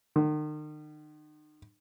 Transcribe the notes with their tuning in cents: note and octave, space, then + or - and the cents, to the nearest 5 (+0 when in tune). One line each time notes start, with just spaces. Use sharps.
D#3 -40